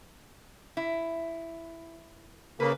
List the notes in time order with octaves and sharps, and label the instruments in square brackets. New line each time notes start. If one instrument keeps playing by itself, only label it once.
[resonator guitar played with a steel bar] E4
[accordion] C#3 A#3 [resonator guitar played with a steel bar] B4